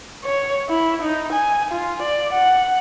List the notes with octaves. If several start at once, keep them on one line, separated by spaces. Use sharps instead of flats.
C#5
E4
D#4
G#5
F4
D5
F#5